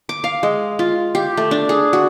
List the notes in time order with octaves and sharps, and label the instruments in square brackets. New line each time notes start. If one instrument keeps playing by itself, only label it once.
[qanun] D6
F5
G#3
F4
G4
A3
D4
G#4
F#4